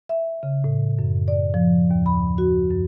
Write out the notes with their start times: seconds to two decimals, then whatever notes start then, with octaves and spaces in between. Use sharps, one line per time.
0.09 E5
0.43 C#3
0.64 A2
0.99 F#2
1.28 D5
1.54 F3
1.91 D#2
2.06 B5
2.38 F#4
2.70 F#2